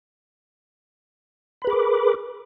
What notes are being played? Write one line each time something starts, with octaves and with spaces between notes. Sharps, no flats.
G#4 A#4 B4 B5 D6